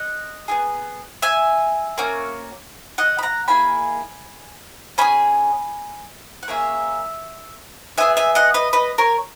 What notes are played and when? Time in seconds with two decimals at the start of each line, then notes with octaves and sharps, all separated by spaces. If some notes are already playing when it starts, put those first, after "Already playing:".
Already playing: D#5 F#5
0.48 B3 E4 G#4
1.22 E5 G#5
1.98 A#3 C#4 F#4
2.98 D#5 F#5
3.19 B5
3.23 F#5 A#5
3.48 A#3 E4 G#4 G#5 B5
4.98 C#4 G#4 G#5 B5
6.43 F#5
6.48 A#3 C#4 G#4 C#5 E5
7.98 B3 E4 G#4 E5 G#5
8.17 E5 G#5
8.35 D#5 F#5
8.54 B4 D#5
8.73 B4 D#5
8.98 A#4 C#5